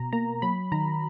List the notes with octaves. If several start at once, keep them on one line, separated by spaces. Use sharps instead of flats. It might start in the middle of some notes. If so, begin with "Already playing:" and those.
Already playing: B2 A#5
A#3 A#5
F#3 B5
D#3 A#5